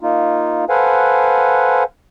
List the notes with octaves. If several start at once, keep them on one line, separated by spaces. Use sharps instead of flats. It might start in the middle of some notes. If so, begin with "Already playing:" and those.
A#3 D#4 F4
A4 B4 C5 F5 F#5 G#5